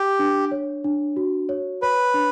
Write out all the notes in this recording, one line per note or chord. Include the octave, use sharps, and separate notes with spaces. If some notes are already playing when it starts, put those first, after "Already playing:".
Already playing: G4
D4
C#5
D4
F#4
C#5
B4 C#5
D4